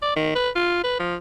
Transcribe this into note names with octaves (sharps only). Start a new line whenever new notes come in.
D5
D#3
B4
F4
B4
F3